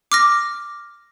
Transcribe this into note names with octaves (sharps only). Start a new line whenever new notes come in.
D6 F6 A#6